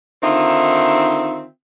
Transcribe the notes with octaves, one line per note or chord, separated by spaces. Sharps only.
D3 D#3 C4 D#4 F4 E5